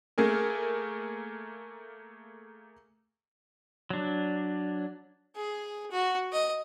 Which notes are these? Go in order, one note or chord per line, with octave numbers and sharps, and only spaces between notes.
A3 A#3 G#4 A#4
F#3 D4
G#4
F#4
D#5